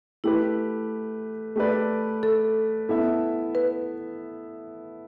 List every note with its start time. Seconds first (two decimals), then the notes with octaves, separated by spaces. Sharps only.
0.24 A3 E4 G4 B4
1.56 A3 G4 B4 D5
2.23 A4
2.89 B3 E4 A4 E5
3.55 B4